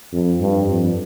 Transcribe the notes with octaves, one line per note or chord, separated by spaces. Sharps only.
F2
G2
F2